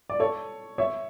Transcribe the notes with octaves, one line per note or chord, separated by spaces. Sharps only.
D5
A4 C#5
C#5 E5